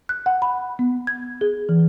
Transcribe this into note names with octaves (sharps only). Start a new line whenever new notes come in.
F#6
F#5
B5
B3
G#6
G#4
E3